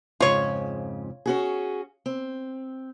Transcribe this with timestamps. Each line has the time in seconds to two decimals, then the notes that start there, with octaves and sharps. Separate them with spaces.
0.20 F2 G#2 C#3 F4 C#5
1.26 C#4 F#4 G#4
2.06 C4